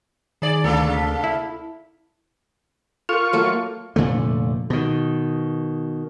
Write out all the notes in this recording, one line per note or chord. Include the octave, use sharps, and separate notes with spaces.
D#3 G#4 D5
D2 C3 A#3 A4
F6 B6
E4
F4 A4 A#4 C#6
F#3 A3 A#3
F1 A#2 D3 A3
B2 D#3